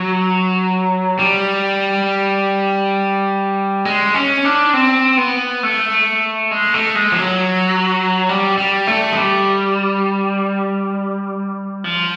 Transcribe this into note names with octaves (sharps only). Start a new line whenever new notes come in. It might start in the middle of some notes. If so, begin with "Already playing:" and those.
Already playing: F#3
G3
G#3
C#4
D4
C4
B3
A3
G#3
A3
G#3
F3
F#3
G3
G3
A3
G#3
G3
F3